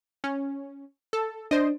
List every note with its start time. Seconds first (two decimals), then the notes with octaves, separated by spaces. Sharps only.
0.24 C#4
1.13 A4
1.51 D4 C5 D#5